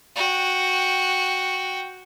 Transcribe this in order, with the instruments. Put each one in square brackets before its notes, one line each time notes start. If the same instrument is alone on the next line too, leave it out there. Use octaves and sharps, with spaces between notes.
[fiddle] F#4 G5